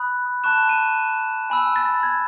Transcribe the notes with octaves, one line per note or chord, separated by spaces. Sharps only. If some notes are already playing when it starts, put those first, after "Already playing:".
Already playing: B5 D#6 F#6
A5 C#6 F#6 E7
D#7
G#5 B5 E6
A6
G#6